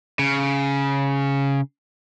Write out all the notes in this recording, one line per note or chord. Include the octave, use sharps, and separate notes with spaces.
C#3